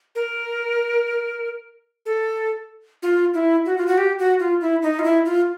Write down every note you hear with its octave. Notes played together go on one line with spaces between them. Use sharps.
A#4
A4
F4
E4
F#4
F4
F#4
G4
F#4
F4
E4
D#4
F4
E4
F4